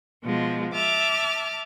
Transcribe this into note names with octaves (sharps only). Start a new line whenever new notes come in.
B2 F3 G#3
E5 A5 D6 F6